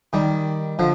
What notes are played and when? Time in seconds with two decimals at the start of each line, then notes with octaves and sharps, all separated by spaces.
0.13 D#3 G3
0.79 D3 F3